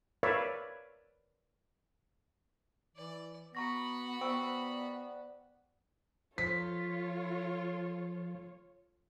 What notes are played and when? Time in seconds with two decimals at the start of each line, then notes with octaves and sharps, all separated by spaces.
0.23 A#4 B4 C#5 D5 E5 F5
2.96 E3 D5
3.55 B3 F#4 A#5 B5 C#6 A#6
4.21 B3 C5 D5 F#5 G5 C#6 E6
6.38 F3 F4 A4 C#5 B6